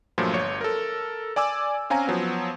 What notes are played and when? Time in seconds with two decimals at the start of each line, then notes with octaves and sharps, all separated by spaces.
0.18 G2 A#2 F3 F#3 A3
0.33 G1 C#5
0.61 A4 A#4
1.36 D5 G#5 D6 E6
1.90 C4 C#4 F5 G#5 A#5
2.07 F3 F#3 B3